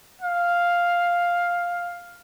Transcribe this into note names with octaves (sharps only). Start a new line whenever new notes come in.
F5